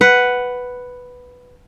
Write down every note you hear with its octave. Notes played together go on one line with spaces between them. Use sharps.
B4 F#5